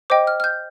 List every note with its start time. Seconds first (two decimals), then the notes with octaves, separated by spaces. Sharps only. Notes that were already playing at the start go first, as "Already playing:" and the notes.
0.10 C5 D#5 G5 D6
0.27 F6
0.40 F6
0.44 G6